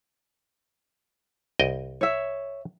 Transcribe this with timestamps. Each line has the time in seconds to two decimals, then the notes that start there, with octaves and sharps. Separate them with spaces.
1.60 C2 D#5 G5
2.01 C#5 E5